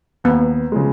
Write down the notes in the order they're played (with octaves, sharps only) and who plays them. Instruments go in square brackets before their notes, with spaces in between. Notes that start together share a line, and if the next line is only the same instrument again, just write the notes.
[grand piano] D#2 [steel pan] B3
[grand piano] C#3 F3 G#3